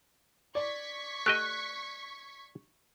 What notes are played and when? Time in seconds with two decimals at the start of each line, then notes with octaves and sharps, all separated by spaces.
0.55 D5 C#6 G#6 B6
1.26 A3 G4 D#5 F#6